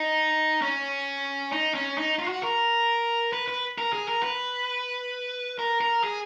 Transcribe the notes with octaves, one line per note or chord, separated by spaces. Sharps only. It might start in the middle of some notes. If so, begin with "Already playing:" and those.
Already playing: D#4
C#4
D#4
C#4
D#4
F4
F#4
A#4
B4
B4
A#4
G#4
A#4
B4
A#4
A#4
G#4